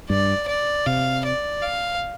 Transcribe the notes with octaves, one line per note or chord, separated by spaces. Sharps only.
G2 D5
D5
C3 F5
D5
F5